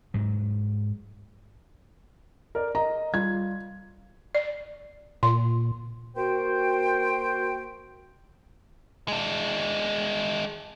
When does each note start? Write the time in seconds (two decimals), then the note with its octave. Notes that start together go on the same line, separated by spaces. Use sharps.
0.14 G#2 F#3
2.55 A#4 D5
2.75 D#5 A#5
3.14 G3 F4 G#6
4.35 D5
5.23 A#2 C6
6.16 A#3 F#4 C5 G5
9.08 G#3 D4